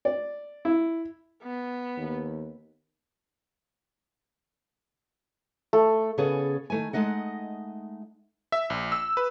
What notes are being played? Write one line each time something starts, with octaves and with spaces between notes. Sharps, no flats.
D5
E4
B3
D#2
A3
C#3 B3 C#4 G#4 A4
D#3 A3 G#5
G#3 A3 D#4 D#5 F#5
E5
A#1
E6
B4